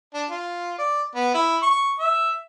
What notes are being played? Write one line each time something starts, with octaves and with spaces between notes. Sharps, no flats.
D4
F4
D5
B3
E4
C#6
E5